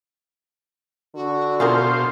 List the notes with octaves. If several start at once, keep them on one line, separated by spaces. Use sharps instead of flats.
D3 F#4
B2 F4 G#4 A#4 C5 F5